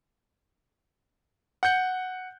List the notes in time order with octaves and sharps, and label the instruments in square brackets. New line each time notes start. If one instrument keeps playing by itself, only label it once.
[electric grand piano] F#5 F#6 G6 C#7